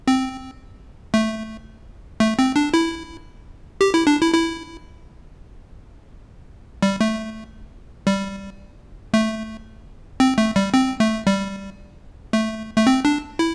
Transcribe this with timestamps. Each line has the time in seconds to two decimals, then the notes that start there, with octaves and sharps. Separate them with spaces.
0.08 C4
1.14 A3
2.20 A3
2.39 C4
2.56 D4
2.74 E4
3.81 G4
3.94 E4
4.07 D4
4.21 E4
4.34 E4
6.82 G3
7.01 A3
8.07 G3
9.14 A3
10.20 C4
10.38 A3
10.56 G3
10.74 C4
11.00 A3
11.27 G3
12.33 A3
12.78 A3
12.87 C4
13.05 D4
13.39 E4